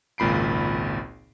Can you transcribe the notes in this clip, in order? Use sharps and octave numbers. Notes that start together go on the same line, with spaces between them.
G#1 C#2 A#2 B5 C7 D7